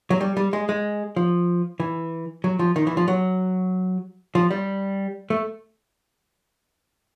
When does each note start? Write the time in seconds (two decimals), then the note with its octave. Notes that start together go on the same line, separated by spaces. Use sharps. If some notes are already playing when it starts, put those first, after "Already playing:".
0.10 F#3
0.21 G3
0.37 G3
0.53 G#3
0.69 G#3
1.16 F3
1.80 E3
2.44 F#3
2.59 F3
2.76 D#3
2.87 E3
2.97 F3
3.08 F#3
4.35 F3
4.51 G3
5.30 A3